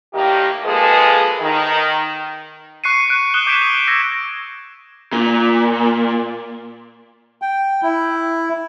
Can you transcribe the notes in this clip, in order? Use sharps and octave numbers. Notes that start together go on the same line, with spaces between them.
A2 D#3 G3 A#3 G4
F3 G#3 A#3 G#4 A4 B4
D#3
C#6 F#6 C7 C#7 D#7
F#6 D7
D#6 F#6 D7 E7 G7
D6 G6 G#6 B6 D7 E7
D#6
E6 G#6 A#6 D7 D#7
A#2
G5
E4